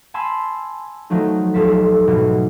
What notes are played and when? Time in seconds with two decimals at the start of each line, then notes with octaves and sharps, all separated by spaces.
0.14 G#5 A5 B5 C6 E6
1.10 D#3 F3 F#3 A3 D#4
1.54 D#1 F4 A4 B6
2.07 G#2 B2 E3 F#3 G#3